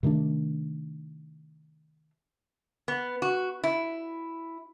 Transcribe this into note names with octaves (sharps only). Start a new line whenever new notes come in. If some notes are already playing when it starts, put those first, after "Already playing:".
C3 D#3 A3 D4
B3
F#4
E4